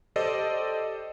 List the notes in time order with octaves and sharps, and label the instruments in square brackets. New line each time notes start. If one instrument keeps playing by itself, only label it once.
[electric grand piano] G4 A4 C5 D5 D#5